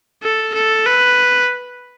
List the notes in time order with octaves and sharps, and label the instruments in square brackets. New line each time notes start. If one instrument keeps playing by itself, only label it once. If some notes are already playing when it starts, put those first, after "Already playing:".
[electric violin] A4
A4
B4